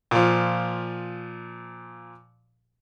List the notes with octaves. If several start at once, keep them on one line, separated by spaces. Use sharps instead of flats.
A#2 F3